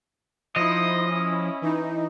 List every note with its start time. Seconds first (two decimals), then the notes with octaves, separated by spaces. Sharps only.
0.56 F3 D#4 E4 C5 D#5
1.07 C#4 E4
1.62 E3 D#4